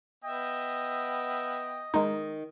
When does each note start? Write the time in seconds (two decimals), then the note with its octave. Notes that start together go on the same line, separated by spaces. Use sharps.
0.24 B3 D#5 E5 G5
1.94 D#3 G#3 D#4